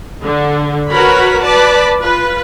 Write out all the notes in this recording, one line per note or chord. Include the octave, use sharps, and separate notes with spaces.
D3
F#4 A#4 B4 C#5 B5
B4 D5 A5 B5
F4 B4